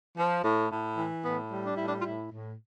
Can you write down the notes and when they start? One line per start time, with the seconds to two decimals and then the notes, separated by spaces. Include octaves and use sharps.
0.18 F3
0.44 A2
0.71 A2
0.98 E3
1.25 A2 B3
1.52 G3
1.65 D4
1.77 A2 E4
1.88 D4
2.00 F4
2.06 A2 E4
2.32 A2